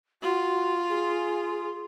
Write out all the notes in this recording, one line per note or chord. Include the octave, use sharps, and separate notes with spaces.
F4 F#4
G#4